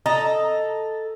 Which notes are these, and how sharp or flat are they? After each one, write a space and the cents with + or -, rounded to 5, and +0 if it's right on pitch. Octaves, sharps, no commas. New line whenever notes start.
A4 +0 D#5 +0 A#5 +0